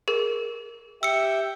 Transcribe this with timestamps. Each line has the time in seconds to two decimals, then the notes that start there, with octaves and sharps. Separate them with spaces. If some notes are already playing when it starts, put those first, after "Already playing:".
0.08 G#4 A#4
1.03 G4 E5 G5 E6 C#7